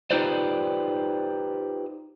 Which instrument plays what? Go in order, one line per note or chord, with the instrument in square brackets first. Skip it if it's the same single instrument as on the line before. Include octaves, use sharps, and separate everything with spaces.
[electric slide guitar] D#4 F4 G4 B4 C5 D5